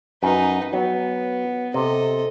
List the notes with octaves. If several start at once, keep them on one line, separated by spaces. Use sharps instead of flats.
F#2 D#4 B4
F#3 B3
C3 A4 D#5